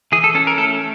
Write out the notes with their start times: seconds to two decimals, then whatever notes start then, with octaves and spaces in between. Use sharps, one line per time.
0.12 E3 G#4
0.24 A4
0.35 C#4 A4
0.47 A#4
0.58 A3 A4